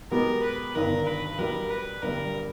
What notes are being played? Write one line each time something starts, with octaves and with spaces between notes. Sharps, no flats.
B2 G#3 B3 G4 A#4
B4
G1 G2 D#3 A#4
B4
B2 G3 B3 A#4
B4
G1 G2 G3 A#4